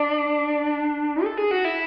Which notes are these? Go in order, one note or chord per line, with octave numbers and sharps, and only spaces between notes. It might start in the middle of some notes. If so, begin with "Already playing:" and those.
Already playing: D4
A4
G#4
F#4
E4